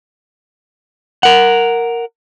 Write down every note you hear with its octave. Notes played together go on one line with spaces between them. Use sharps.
A#4 F#5